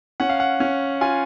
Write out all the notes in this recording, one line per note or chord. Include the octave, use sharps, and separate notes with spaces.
C#4 F#5
F5
F#5
C#4
F4 G#5